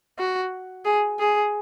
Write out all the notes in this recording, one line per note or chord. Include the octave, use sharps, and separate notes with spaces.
F#4
G#4
G#4